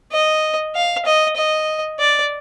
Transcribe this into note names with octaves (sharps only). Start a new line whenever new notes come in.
D#5
F5
D#5
D#5
D5